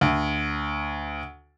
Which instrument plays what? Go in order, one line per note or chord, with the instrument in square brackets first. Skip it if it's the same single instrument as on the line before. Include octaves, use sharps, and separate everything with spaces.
[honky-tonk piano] D2